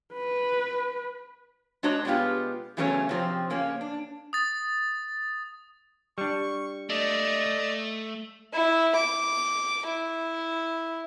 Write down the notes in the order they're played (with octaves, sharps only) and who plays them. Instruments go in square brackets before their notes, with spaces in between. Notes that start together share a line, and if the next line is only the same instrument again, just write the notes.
[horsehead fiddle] B4
[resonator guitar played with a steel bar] G#3 D4 F#4 C#5 D#5 A#5
B2 G3 G#3 B3 F4 G4
E2 C#3 F#3 A3 A#3 C#4
C3 F3 C4
C#3 A#3 C#4
D4
[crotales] D#6 A6
[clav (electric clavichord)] G3 D4 [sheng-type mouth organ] C#6
[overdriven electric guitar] A3 [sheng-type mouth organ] D5 D#5
[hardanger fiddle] E4
D6
E4